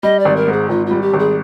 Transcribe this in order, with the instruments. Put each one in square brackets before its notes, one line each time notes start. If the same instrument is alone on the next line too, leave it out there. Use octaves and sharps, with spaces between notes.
[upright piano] G3 [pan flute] D#5
[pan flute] D5
[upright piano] G#1
[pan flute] A#4
[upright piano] G#2 [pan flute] G#4
[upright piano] G#1 [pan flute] F4
[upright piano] G3 [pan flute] F4
[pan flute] G4
[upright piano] G#1
[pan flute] G#4